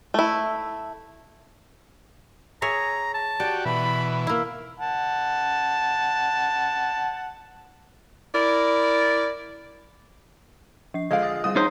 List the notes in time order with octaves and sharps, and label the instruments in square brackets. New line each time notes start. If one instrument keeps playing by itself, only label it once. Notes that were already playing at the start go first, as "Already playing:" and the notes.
[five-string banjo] A3 E4
[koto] G#4 C#5 E5 [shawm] A#5
[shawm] A5
[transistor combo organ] F#4 G4 [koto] D5
[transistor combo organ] B2 E3 [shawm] B5
[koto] A#3 E4 [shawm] E5
[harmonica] F#5 A5
[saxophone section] E4 A#4 D5
[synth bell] F3 C7
[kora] D3 F3 G#3 [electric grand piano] D#5 F5 [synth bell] G#6 D7
[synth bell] D#6 A6
[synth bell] G3 G#4 [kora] C4 D#5 [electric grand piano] D#6
[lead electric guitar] D#4 C5 [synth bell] C#5 A#5